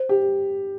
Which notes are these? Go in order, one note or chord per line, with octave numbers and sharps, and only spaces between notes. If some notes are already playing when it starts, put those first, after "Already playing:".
Already playing: C5
G4